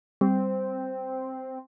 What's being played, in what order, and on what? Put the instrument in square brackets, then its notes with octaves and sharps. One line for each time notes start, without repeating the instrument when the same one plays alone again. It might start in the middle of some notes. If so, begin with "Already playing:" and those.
[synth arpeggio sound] G3 [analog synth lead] C4